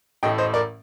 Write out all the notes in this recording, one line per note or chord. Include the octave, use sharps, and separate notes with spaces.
A1 A2 A3 D#5 G5
C5 D#5
A#4 D5